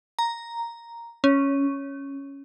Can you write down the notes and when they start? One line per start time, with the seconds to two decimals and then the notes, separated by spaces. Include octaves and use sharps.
0.19 A#5
1.24 C#4